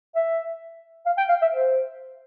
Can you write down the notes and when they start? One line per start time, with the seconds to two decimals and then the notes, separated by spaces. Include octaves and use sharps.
0.15 E5
1.06 F5
1.18 G5
1.29 F5
1.42 E5
1.53 C5